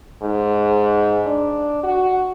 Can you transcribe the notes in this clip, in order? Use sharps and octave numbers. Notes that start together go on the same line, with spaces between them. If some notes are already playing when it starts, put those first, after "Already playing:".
G#2
D4
F#4